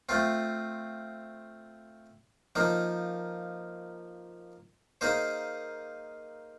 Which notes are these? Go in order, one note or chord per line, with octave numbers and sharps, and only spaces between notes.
A3 C4 F4
F3 A#3 D#4
A#3 D#4 G#4 C5